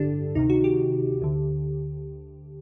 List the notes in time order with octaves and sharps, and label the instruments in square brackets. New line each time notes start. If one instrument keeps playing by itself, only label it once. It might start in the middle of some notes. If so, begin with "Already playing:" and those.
Already playing: [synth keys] A1 G2 D3 D4 G4 A4
D2 C3 D#3 D#4
F#4
G4
D2 D3